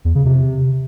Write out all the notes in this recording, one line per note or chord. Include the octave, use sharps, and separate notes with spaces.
E2
C#3
C3